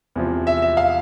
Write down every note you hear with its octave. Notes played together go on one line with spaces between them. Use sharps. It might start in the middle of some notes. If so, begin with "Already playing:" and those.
E2 C3 F3
E5
E5
F5